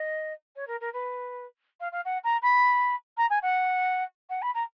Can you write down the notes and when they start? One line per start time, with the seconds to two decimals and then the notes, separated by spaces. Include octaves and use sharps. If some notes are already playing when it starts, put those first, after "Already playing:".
Already playing: D#5
0.56 C#5
0.67 A#4
0.80 A#4
0.93 B4
1.80 F5
1.92 F5
2.05 F#5
2.24 A#5
2.42 B5
3.17 A#5
3.30 G#5
3.42 F#5
4.30 F#5
4.42 B5
4.54 A#5